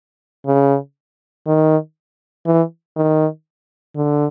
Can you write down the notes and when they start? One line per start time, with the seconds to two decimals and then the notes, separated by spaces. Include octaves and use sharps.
0.47 C#3
1.47 D#3
2.46 E3
2.96 D#3
3.96 D3